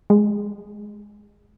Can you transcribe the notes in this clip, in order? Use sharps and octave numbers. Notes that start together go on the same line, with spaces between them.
G#3